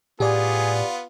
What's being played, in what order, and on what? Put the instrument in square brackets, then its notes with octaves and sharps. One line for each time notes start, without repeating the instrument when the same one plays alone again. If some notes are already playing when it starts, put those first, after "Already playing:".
[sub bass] A2 [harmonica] B3 F4 [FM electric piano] G4 D5 G#5 [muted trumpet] G#4